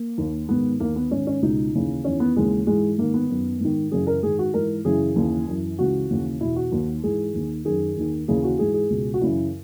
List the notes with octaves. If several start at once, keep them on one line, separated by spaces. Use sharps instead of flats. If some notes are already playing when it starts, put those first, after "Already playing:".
Already playing: A#3
D#2 D#3
G#2 D#3 B3
D#2 D#3 A#3
B3
G#2 D#3 C#4
C#4
C#2 B2 D#4
D#2 C#3 E3
E2 D#3 C#4
B3
D#2 C#3 E3 G#3
G#2 E3 G#3
G#2 D#3 A#3
B3
F#2 D#3
G#2 D#3
F#2 C#3 E3 G#4
A#4
G#2 D#3 G#4
F#4
G#2 E3 A#4
F#2 C#3 E3 G#4
D#2 C#3 E3
F#2 E3
C#2 C#3 E3 F#4
D#2 C#3 E3
E2 B2 E4
F#4
D#2 D#3
G#2 E3 G#4
D#2 D#3
F#2 D#3 G#4
D#2 D#3
D#2 C#3 E3 G#4
F#4
G#2 E3 G#4
G#4
C#2 B2
F#4
F#2 C#3 E3 E4